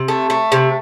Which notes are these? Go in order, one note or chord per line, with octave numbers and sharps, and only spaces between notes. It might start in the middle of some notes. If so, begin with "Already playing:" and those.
Already playing: C3
A3
A3
C3